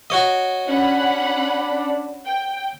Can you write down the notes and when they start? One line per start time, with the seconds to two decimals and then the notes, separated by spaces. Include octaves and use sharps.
0.10 F#4 C#5 D#5
0.68 C#4 D4 F#5 B5
2.26 G5